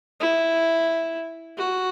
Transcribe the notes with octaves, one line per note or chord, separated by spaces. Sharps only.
E4
F#4